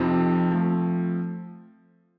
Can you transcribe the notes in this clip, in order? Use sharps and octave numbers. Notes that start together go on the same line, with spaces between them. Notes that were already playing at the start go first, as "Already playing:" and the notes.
Already playing: F2 C3 F3 C4 D#4
F3 A3 C4